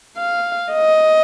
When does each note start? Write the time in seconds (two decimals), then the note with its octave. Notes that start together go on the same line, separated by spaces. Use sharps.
0.17 F5
0.72 D#5